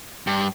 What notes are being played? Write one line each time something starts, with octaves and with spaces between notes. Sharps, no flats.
G2